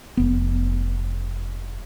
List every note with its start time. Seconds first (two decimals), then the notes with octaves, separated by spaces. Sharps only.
0.17 F1 B3